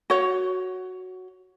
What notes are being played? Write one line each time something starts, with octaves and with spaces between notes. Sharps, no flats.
F#4 C#5